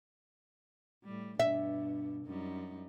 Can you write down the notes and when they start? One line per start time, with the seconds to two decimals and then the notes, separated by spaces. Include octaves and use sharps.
1.04 A2 G3
1.40 G2 B2 D4 E5
2.26 F#2 G3 D#4